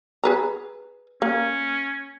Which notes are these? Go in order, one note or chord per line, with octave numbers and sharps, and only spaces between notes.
G#4 B4 A#5
A#3 C#4